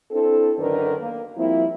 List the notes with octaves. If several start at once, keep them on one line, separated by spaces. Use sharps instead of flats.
C4 D4 E4 A4
F#2 D3 D#3 D4 A#4 B4
A#3
F3 G3 A#3 C4 E4